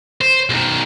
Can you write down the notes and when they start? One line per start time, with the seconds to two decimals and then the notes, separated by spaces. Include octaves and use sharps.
0.21 C5
0.50 B1 D#3